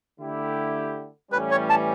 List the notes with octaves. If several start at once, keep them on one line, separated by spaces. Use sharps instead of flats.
D3 A3 E4 G4
A2 E3 G3 C#4 B4
C#5
A5